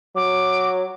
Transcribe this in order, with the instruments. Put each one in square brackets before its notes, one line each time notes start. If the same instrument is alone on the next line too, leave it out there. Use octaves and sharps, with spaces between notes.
[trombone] F#3 [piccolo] D6